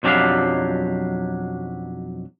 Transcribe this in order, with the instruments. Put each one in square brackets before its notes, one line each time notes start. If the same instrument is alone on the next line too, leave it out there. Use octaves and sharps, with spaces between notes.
[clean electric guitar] B1 F2 F#3 D4 G4 F5